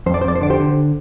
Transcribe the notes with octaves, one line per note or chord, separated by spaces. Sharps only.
F2 C5
D5
C5
F2 D5
C5
D3 D5
G4 C5
D3